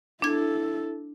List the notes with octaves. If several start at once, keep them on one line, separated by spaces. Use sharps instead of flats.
D4 E4 A4 G#6